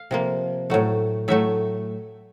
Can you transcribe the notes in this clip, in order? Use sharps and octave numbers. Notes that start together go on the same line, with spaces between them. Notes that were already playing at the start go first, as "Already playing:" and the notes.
Already playing: F5
C3 F3 A#3
A2 F#3 A3
A2 F#3 A3 E5